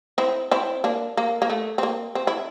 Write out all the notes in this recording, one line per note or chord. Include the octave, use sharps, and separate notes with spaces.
C4 E4
C4 E4
A#3 D4
A#3
A#3
A3
C4
A#3
C4
E4